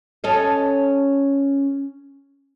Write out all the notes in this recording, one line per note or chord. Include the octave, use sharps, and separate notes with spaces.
C#4 A4 D#5